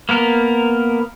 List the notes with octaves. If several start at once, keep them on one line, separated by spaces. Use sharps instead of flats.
A#3 B3 A#4